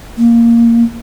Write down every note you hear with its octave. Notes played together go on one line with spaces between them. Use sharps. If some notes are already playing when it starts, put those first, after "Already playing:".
A#3